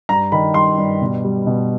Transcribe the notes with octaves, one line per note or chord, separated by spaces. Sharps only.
G2 A#5
D#3 B5
G3 C6
G2
B2
G3
B2